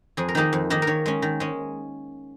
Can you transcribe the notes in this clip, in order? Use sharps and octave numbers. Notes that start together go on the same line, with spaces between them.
F2 G#4
A#4
D#3 A#3 D#4 G#4
F2
D#3 A#3 D#4
A#4
D#3 C#5
G#3 C#4
D#3
G#3 C#4